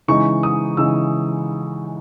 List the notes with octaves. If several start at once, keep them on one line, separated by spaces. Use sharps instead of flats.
C#3 E3 G#3 D#4 C#6
D#6
C#3 E3 G#3 D#4 E6